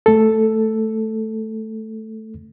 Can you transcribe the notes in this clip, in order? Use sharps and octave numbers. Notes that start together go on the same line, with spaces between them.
A3 A4